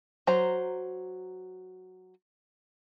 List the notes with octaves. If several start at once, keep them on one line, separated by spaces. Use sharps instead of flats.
F#3 C5 A#5